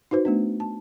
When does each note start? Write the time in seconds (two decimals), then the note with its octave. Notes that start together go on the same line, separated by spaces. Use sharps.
0.11 D#4 F#4 B4 C5
0.25 A3 B3 D4
0.60 A5